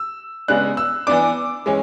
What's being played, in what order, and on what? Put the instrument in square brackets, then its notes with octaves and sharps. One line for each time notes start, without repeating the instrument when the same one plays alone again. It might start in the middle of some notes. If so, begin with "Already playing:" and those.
Already playing: [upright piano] E6
C#3 G#3 B3 D4 F#6
E6
E3 B3 D4 D6
E3 G#3 C#4